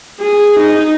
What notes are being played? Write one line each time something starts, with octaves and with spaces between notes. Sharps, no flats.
G#4
D#4